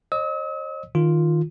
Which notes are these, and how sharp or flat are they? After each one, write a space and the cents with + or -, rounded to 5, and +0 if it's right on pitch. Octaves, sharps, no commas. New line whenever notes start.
C5 +45 D#5 -25 E6 -45
D#3 +0 F4 +0